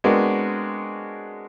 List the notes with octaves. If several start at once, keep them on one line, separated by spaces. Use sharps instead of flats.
G#3 B3 C4 D4 F#4 A#4